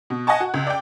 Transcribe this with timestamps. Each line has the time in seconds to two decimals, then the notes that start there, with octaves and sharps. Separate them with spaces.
0.10 B2
0.27 D#5 F#5 G#5 A5 C#6
0.40 F#4
0.54 C#2
0.67 D5 G5